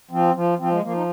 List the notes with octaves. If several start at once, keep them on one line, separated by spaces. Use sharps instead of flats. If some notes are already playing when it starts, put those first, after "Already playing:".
F3 C4
F3
F3 C4
G#3
F3 A#3
D#4